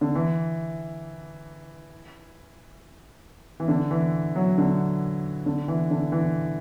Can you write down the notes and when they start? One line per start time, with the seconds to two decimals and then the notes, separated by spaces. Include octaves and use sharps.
0.01 D3
0.15 E3
3.60 E3
3.68 D3
3.91 E3
4.36 F#3
4.58 D3
5.46 D3
5.68 E3
5.90 D3
6.12 E3